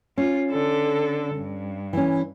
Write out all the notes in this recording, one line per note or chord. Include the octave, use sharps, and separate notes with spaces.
C#4 F4
D3 A4
G2
E3 C#4